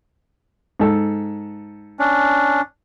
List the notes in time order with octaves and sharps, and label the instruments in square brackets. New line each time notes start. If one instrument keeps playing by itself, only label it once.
[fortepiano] G#2 A4
[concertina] C#4 D4